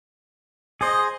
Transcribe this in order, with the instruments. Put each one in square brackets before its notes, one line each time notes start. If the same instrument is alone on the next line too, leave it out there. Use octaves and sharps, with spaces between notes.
[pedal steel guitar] G#4 C5 [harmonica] D#5